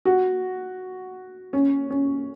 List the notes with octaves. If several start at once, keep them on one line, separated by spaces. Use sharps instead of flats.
F#4
C#4
C#4